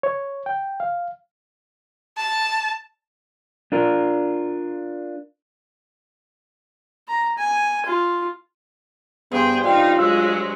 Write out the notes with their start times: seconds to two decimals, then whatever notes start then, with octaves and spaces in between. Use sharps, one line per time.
0.03 C#5
0.46 G5
0.80 F5
2.17 A5
3.72 D4 F4 A#4
7.08 A#5
7.38 G#5
7.86 F4
9.32 G2 B3 G#4 C5 G5
9.64 D#4 F4 D5 F5 G5
9.99 F#3 G#3 E6